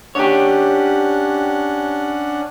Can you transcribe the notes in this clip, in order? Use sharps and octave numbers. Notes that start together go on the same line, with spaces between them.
C#4 D4 G4 C#5 F#5